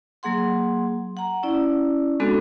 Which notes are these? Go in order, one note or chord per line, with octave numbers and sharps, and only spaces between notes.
F#3 A#3 G#4 F#5 C6
F#5 A#5
C#4 E4 D5
G#3 B3 C4 D4 F#4 A4